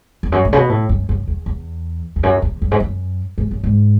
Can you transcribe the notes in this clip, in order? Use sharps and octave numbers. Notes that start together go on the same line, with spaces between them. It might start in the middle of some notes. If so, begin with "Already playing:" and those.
E2
F#2
A2
C#3
B2
A2
F#2
F#2
E2
E2
E2
F#2
E2
F#2
G#2
F#2
G#2
F#2
G#2